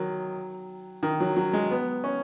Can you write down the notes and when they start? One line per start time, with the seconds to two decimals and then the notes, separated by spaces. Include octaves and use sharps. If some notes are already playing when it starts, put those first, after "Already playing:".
Already playing: D#3 F#3
1.03 D#3
1.20 F#3
1.37 F#3
1.53 G#3
1.71 B3
2.04 C#4